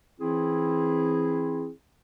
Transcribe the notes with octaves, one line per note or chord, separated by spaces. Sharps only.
E3 C4 E4 G#4